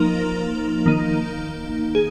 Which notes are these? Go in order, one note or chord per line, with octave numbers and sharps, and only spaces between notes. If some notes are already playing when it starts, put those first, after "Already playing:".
Already playing: F3 A#3 D#4 A#4
D#3 A#3 D#4
G#4